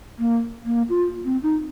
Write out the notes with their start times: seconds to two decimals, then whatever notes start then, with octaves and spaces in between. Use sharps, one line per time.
0.19 A#3
0.66 A#3
0.89 F4
1.25 C4
1.43 D#4